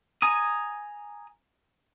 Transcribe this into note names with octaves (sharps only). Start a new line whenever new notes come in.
G#5 A#5 D#6